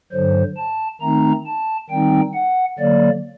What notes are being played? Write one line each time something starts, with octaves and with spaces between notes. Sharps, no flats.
G2 D3 F#3 C5
A5
D#3 A3 C4 D#4 A#5
A5
D#3 G3 C4 D#4 G5
F#5
D3 F#3 A#3 D5